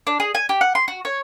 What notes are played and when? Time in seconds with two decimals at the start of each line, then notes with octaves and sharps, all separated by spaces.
0.07 D4
0.20 G#4
0.35 G#5
0.49 G4
0.61 F#5
0.75 C6
0.88 F#4
1.05 C#5